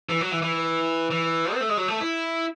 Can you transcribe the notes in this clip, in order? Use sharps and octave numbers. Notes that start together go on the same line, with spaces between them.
E3
F#3
E3
E3
E3
C4
A3
G#3
F#3
A3
E4